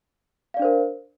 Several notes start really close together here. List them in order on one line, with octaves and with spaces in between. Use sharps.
F5 D5 D4 C5 A#4